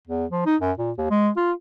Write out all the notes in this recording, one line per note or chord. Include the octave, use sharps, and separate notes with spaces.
E2
F3
D#4
F#2
A#2
D#2
G#3
F4